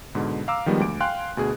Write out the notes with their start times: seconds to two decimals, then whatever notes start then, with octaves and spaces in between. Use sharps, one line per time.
0.15 G#2 B2 D3
0.48 F5 A#5 D6 E6
0.66 D#3 F3 G3 G#3 B3
0.80 D2 D6 D7
1.00 F5 G5 G#5 C6 F#6
1.37 D2 B2 G#4